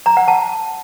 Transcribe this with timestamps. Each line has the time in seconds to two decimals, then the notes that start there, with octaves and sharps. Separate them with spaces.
0.06 A#5
0.17 F#5
0.28 A5